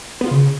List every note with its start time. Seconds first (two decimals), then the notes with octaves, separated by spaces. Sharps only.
0.21 B3
0.26 F4
0.31 C#3